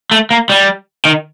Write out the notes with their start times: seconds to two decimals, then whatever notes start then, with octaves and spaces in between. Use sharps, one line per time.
0.11 A3
0.31 A#3
0.49 G3
1.05 D#3